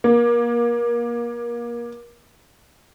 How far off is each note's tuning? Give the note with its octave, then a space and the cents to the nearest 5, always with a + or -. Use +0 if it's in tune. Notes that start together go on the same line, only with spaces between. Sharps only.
A#3 +30